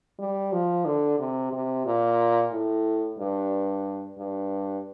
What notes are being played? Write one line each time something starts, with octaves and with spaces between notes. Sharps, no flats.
G3
F3
D3
C3
C3
A#2
A2
G2
G2